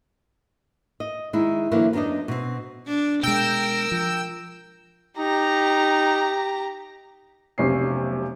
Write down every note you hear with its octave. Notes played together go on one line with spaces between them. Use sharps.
D#5
D#3 G#3 E4
D3 E3 F#3 G#3 A#3 E4
F#2 B3 D4 D#4 D#5
B2 C4
D4
B2 G#3 A#4 G5 E6
F3
D#4 G4 A#5
F1 B1 C3 C#4 C7